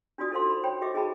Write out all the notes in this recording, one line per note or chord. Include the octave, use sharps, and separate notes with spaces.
D4 F4 F#4 D5 D#6
D#4 A4 A#4 C5 F5 C6
B5
C5 C#5 G5 B5
F#4 G4 D#5 E5 D6
D#4 G#4 D#5 G5 A5 B5